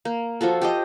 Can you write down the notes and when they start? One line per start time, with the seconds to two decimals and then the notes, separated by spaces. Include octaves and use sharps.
0.05 A#3
0.41 F3 F4 F#4 A4
0.61 G4 C5 D#5